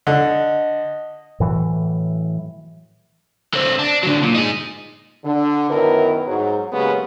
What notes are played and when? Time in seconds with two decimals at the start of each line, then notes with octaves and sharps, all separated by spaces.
0.07 D3 D#5
1.40 A2 E3 F#3
3.54 D3 C4
3.79 D4
4.03 D3 F#3
4.22 A#2
4.34 D#4 G#4
5.25 D3
5.70 F#2 D#3 B3 E4 A#4 B4
6.27 G#2 F#3
6.72 C#3 F#3 G#3 A#3 B3 G4